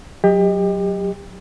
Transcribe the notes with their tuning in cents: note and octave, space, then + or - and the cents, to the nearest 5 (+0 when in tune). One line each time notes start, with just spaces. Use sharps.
F#3 +0 G4 +30 D#5 +0